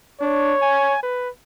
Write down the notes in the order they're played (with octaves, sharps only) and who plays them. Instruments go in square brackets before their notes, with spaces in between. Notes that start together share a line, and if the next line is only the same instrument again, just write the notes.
[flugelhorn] D4 [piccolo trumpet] C#5
[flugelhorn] G#5
B4